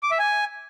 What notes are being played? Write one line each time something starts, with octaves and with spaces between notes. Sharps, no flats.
D6
E5
G#5